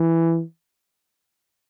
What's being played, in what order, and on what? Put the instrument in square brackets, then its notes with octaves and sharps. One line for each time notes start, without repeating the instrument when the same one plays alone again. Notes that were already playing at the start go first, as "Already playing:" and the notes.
Already playing: [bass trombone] E3